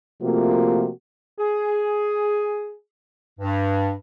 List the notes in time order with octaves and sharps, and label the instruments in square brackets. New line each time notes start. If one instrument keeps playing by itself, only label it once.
[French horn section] C3 F3 A3 A#3 F4 F#4
[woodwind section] G#4
G2